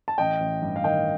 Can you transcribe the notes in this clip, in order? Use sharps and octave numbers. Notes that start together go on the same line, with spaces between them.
A5
A1 D#5 G5
A1
G2
F5
D#3 D#5 G5